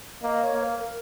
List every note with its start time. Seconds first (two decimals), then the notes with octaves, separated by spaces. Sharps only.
0.23 A#3 D#5
0.43 C#5
0.53 A#3
0.63 A#4
0.83 A#4